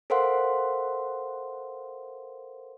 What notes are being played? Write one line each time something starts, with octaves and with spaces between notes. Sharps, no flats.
A4 A#4 C5 F5 F#5 C6